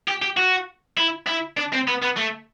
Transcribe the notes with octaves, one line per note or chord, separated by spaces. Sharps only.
G4
G4
F#4
E4
E4
D4
C4
B3
B3
A3